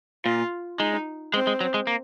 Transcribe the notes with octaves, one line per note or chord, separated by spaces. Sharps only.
A#2 F4
G#3 D#4
G#3 C4
G#3
F#3
G#3
A#3